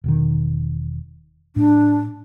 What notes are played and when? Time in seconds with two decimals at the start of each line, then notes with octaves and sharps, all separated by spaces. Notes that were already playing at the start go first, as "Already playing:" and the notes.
0.04 E1 B2 D#3
1.56 A2 D4